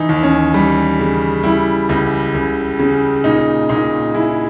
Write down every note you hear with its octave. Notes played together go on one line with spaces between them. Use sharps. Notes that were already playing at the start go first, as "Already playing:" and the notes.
Already playing: E3 D#4
D#2
C#4
G3
C#3
G3 E4
C#2
C#2
C#3
A#2 D#4
A#2 D#4
G#3 E4